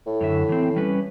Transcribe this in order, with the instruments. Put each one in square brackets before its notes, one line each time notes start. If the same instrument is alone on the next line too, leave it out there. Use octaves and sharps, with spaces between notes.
[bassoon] A2
[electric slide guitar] F#2 D3 E5
E3 C4
G3 C#4 B4